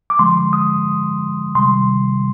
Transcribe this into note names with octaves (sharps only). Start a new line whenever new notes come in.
D6
D3 F3 G#3 C6
D#6
C3 D#3 G3 C6